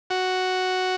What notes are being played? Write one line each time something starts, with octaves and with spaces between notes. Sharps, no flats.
F#4